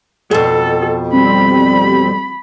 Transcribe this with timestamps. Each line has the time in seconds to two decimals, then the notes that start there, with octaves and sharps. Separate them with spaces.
0.31 F2 B2 A4
1.13 G3 C4 B5